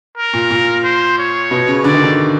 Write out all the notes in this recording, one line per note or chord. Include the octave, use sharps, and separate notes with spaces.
A#4
A#2
A#2
C5
C#5
B2
C#3
D3 D5
D#3
D3